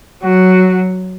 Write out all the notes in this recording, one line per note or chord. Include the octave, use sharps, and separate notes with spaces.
F#3 F#4